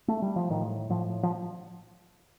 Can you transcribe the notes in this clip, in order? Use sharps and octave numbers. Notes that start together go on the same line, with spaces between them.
A3
G3
F3
A2 D#3
A2 F3
F3